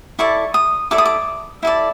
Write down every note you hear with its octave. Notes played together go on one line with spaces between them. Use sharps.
E4 A4 D5 C#6
D#6
E4 A4 D5 D6
D#6
D6
E4 A4 D5